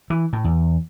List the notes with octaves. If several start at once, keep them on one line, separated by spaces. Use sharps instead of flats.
E3
A2
E2